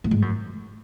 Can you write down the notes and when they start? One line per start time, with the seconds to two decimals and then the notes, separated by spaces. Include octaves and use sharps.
0.04 A2
0.11 G#2
0.22 F#2